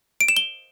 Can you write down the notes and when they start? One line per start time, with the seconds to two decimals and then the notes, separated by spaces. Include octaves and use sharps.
0.20 D7
0.28 E7
0.37 G7